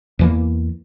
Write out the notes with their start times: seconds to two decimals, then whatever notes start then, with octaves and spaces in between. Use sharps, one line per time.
0.19 E2 E3 A#3